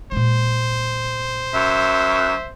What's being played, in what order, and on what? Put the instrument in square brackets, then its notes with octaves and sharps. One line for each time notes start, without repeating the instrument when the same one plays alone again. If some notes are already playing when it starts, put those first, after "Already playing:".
[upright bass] A#2 G#3 [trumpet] C5
[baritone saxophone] F#2 [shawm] E5